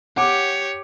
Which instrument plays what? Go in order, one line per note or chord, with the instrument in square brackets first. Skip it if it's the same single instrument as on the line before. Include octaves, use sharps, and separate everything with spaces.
[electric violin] G4 C#5 [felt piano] F#5 D6